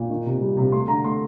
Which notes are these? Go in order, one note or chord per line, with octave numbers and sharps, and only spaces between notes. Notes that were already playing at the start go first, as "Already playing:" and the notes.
Already playing: A#2
D#3
C3
G3
C3
A3 C6
D3 A#5
A3 C6